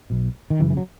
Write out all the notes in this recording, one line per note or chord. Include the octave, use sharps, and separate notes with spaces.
B1 B2
D#3
F#1 F#2 C#3 E3
E3
F#3